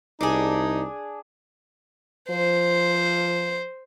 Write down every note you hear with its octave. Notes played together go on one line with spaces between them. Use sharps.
C2 D4 D#4 G#4
F3 C5